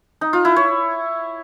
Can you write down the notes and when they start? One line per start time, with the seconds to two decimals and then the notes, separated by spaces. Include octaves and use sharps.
0.21 D#4
0.33 F4
0.45 E4
0.56 C#5